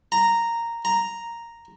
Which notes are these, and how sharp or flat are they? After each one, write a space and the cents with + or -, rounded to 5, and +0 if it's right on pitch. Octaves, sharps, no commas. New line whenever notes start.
A#5 -5
A#5 +0